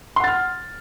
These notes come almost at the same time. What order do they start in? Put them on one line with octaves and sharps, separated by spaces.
C6 F#5 A6 F6